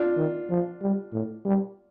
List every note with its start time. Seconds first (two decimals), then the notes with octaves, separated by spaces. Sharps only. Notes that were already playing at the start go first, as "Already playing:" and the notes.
Already playing: D4 F4
0.17 D#3
0.50 F3
0.82 G3
1.13 A2
1.46 G3